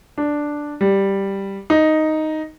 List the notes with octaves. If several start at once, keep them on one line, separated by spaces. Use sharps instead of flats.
D4
G3
D#4